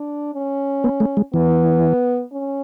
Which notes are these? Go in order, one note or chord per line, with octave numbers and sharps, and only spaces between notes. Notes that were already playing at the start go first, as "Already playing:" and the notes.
Already playing: D4
C#4
B3
A3
G#3
E3 B3
C#4